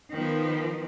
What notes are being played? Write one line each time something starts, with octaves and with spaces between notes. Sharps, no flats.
D#3 F3 B3